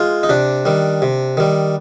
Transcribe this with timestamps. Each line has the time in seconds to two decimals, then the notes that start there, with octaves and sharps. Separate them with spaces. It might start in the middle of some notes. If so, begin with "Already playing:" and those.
Already playing: G#3 F4
0.23 D#4
0.29 C3 D4
0.65 D#3 G3
1.02 C3
1.37 D#3 G3